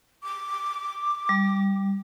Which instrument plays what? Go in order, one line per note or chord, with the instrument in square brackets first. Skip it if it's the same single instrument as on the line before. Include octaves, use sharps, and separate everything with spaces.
[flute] D6
[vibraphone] G3